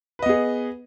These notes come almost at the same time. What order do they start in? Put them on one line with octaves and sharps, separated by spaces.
B4 D#5 B3 G#4